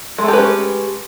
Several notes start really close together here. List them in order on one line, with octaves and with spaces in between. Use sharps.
G#3 A3 G4 B4 C#4